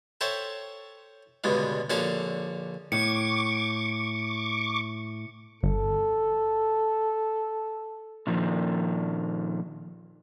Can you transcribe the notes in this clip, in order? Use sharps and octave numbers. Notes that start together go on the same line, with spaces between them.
A4 C5 C#5 E5 F#5 G5
C#2 G2 B2 D3 G#3
A#1 D3 C#4 F#4 A4 F5
A2 C#6 D6 C#7
G1 A4
A#2 D#3 F3